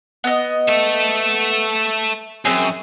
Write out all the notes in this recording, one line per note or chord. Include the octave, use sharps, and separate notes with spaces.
B3 D#5
A3 A4
F#2 C4 G#4